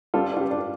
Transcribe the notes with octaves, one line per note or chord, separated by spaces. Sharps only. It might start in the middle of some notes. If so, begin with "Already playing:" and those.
G3 F4 A4
D4 F4
G4
D4